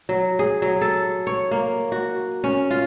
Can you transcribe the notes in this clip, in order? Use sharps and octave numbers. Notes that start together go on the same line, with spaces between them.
F#3
G#4
F#3
A4
C#5
A#3
F#4
C#4
F4